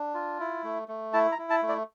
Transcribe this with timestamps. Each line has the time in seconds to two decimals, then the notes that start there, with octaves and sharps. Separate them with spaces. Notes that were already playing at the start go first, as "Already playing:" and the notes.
Already playing: D4
0.14 F4
0.40 E4
0.64 A3
0.88 A3
1.13 E4 A5
1.32 A#5
1.38 E4
1.50 A5
1.63 A3
1.69 D5